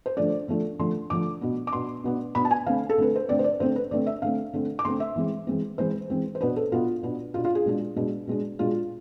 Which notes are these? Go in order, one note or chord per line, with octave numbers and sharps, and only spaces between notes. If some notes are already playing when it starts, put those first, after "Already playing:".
C5
D3 F3 A3 D4 D5
D3 F3 A3 D4
D3 F3 A3 D4 C6
D3 F3 A3 D4 D6
B2 B3 D4
D6
B2 B3 D4 C6
B2 B3 D4
B2 B3 D4 B5
A5
G#5
D3 A3 C4 F5
A4
D3 A3 C4 B4
C5
D3 A3 C4 D5
C5
D5
D3 A3 C4 C5
B4
D3 A3 C4 D5
E5
D3 A3 C4 F5
D3 A3 C4
D6
D3 A3 C4 C6
E5
E3 G#3 C4
E3 G#3 C4
E3 G#3 C4 C5
E3 G#3 C4
C5
B2 B3 D4 B4
A4
B2 B3 D4 F4
B2 B3 D4
B2 B3 D4 F4
F4
G#4
B2 G#3 D4
B2 G#3 D4
B2 G#3 D4
B2 G#3 D4 F4